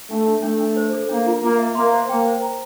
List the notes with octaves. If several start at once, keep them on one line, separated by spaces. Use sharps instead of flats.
A3 D4
D4
A3 D4
D4
C5
A4
A#3 D4
F4
A#3 F4
E5
A#3 C6
C5
A#3 G5
C5
A#5